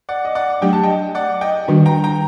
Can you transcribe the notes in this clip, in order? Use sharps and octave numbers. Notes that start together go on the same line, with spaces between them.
D5 F#5
D#5
D5 F#5
F#3 A3 D4 G4 G5
A5
D#5 G5
D5 F#5
D#5 G5
D#3 G3 D4 F#4
G5 A#5
G5 A#5